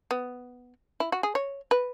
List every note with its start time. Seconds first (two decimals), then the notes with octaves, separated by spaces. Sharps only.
0.11 B3
1.00 E4
1.12 F#4
1.23 G#4
1.35 C#5
1.71 B4